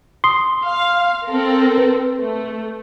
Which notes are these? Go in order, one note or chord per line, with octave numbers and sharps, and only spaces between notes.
C6 D#6
F5
C4 A4 A#4
B4
A3